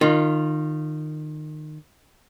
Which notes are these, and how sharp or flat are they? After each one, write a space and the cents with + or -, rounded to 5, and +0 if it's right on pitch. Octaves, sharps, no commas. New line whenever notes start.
D#3 -25 F4 +0